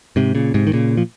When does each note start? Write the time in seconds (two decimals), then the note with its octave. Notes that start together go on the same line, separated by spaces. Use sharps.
0.16 G#2 C3
0.35 A#2 C#3
0.54 G#2 C3
0.67 D#3
0.73 A#2 C#3
0.97 F3